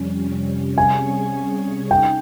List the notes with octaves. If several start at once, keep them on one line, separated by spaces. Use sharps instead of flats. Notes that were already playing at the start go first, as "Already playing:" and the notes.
Already playing: F2 C3 G3 C#4
C3 G3 C#4 G#4 C#5 G#5
D#4 G5